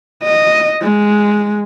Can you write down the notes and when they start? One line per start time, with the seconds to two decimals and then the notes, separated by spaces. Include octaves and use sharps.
0.24 D#5
0.82 G#3